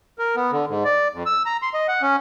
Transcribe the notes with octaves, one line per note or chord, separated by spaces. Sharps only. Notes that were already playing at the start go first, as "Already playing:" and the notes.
A#4
B3
D3
G#2
D5
F2
E6
A#5
C6
D#5
F#5
C#4